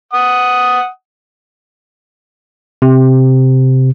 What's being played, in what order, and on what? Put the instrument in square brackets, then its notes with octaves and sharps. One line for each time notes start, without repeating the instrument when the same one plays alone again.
[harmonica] F#5 D#6
[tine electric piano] C3